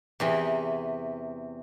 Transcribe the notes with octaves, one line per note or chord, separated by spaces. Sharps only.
E2 C3 E3